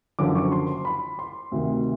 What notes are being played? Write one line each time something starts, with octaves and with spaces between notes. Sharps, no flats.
F#1 F#2 D3 F3 D6
C#6
C6
B5
C6
D2 C3 D#3